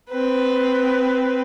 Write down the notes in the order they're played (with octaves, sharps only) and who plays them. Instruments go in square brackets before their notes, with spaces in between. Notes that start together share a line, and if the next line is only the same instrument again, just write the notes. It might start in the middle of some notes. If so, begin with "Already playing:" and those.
[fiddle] C4 B4